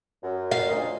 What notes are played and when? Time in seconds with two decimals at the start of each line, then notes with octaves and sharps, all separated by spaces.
0.23 F#2
0.51 F5
0.70 D2 A#2 D#5